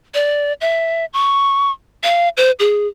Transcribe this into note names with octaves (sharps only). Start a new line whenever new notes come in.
D5
E5
C#6
F5
C5
G#4